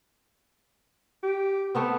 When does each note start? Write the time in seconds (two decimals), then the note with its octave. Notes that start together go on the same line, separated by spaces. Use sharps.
1.23 G4
1.75 A3 B3 C4